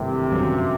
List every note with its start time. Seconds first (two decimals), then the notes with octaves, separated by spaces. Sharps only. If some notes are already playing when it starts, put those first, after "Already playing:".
Already playing: G#1 G2 C3 E3 A3
0.32 G1 F#2 D3 F#3 B3